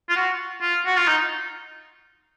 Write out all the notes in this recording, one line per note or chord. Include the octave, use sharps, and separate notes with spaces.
F4
F#4
F4
F#4
F4
D#4